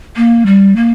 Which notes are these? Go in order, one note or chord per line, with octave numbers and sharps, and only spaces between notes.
A#3
G3
A#3